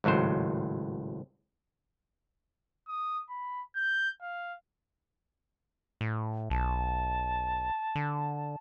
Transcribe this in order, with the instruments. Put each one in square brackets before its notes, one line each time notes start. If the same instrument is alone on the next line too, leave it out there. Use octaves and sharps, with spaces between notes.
[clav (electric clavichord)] G#1 C#2 A2 F#3 C5
[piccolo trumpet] D#6
B5
G6
F5
[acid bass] A2
[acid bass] B1 [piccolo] A5
[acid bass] D3